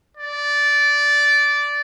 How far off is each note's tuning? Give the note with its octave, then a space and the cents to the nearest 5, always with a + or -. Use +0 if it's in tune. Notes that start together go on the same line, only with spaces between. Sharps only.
D5 -15